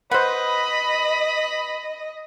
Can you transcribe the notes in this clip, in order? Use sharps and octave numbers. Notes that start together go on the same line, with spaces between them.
B4 C5 D#5 F#5 B5